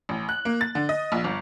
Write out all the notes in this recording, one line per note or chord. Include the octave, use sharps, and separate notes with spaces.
A1
F#6
A#3
A6
D3
D#5
A#1
G1